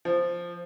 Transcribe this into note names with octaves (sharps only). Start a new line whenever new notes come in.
F3